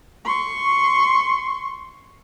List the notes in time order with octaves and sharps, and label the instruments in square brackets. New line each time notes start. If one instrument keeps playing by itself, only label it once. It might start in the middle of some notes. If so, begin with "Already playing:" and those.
[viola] C6 C#6